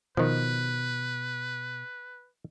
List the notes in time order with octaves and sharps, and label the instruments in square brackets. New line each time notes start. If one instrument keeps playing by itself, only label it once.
[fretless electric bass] B2 [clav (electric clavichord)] D#3 F3 [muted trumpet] B4